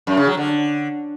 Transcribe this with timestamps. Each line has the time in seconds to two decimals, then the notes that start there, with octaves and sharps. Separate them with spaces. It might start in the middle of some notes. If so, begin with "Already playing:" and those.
0.07 F#2
0.17 C#3
0.27 F#3
0.37 D3